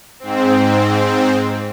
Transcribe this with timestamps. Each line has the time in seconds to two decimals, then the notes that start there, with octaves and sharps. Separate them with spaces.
0.19 G#2 C4